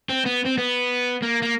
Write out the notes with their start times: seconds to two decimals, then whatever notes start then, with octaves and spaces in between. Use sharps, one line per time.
0.09 C4
0.25 B3
0.45 C4
0.57 B3
1.22 A#3
1.42 A#3